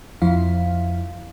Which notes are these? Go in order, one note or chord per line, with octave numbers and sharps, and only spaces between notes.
F2 F3 E4 F5